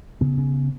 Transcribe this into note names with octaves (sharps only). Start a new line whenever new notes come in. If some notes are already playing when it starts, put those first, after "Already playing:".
C#3 B3
C#3